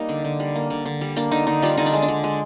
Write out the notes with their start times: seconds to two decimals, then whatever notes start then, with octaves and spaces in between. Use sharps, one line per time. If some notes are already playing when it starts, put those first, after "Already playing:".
Already playing: G3 A#3 D#4
0.09 D3
0.24 D3
0.40 G3
0.55 A#3
0.70 D3
0.85 D3
1.01 G3
1.16 A#3 D4
1.31 D3 D#4
1.47 D3 D#4
1.62 G3 D4 F4
1.77 D3 D#4
1.86 D4
1.93 G#3
2.02 D4
2.08 D3
2.24 G#3